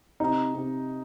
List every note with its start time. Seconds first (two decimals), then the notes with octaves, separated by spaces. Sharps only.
0.20 C3 D#4
0.54 C3